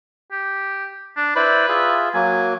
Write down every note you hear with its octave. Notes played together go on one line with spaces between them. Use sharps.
G4
D4
E4 B4 C5 D5
F4 G#4 E5
F#3 A#3 G#5